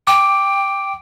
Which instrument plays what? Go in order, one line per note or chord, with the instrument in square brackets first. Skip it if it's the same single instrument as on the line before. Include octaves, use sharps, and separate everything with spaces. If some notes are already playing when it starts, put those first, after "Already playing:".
[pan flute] G5 [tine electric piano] D6